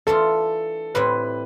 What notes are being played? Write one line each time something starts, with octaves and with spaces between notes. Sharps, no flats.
E3 A3 D4 F4 A4
A2 G3 C4 E4 B4